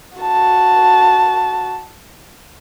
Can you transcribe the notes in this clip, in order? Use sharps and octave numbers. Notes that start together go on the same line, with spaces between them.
F#4 A5